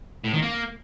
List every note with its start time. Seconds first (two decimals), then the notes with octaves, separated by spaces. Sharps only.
0.24 A2
0.33 D#3
0.42 A#3